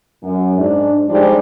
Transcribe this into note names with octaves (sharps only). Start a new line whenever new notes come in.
F#2
G#2 D4
F3 G3 G#3 D4 D#4 C5